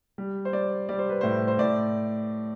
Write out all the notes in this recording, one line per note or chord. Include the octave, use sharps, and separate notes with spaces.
G3
C5
G3 D5
G3 D5
C5
B4
A2 C5
C5
A2 D5